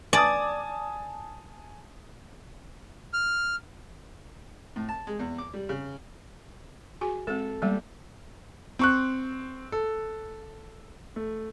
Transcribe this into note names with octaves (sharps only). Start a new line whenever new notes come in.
D5 G#5 A5 D#6
F6
A2
A5
G#3
E2
D6
G3
C#3
F#4 G#4 G#5
G#3 C4 A4
G3 G#3 A#3 B3
C4 C#6 F#6
A4
A3